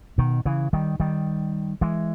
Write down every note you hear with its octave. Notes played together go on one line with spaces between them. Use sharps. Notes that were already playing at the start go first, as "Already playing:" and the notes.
B2 D#3
C#3 E3
D#3 G3
D#3 G3
E3 G#3